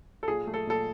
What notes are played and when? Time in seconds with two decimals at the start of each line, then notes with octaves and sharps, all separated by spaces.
0.23 A4
0.28 A#2 G#4
0.47 A3
0.54 A4
0.67 A#2 A4